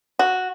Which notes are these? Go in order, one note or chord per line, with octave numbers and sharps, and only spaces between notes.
F#4